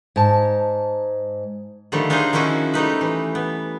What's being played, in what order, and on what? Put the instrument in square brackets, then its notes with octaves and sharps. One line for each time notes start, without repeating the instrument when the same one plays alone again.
[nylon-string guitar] G#2 A5
[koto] D3 D#3 F3 G3 A3
D4 D#4 G#4 C5 D#5 F5
D#3 F3 C#4 E4 F#4 D#5
G3 A3 D#4 B4
E3
B3